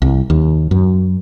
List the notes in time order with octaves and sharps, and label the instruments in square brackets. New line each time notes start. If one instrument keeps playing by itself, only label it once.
[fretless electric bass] C2
D#2
F#2